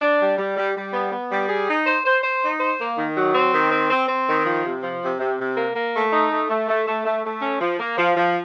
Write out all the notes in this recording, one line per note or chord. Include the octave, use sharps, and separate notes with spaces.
D4
G3
G3
G3
G3
B3
B3
G3
G#4
D#4
C5
C5
C5
D#4
C5
A#3
D#3
F#3
C4
D#3
C4
C4
C4
D#3
F3
C3
F3
C3
C3
C3
A#3
A#3
A3
D#4
A3
A3
A3
A3
A3
A3
C#4
F3
A#3
F3
F3